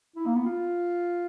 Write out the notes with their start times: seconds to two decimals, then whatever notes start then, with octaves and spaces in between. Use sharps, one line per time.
0.16 E4
0.26 A#3
0.35 B3
0.46 F4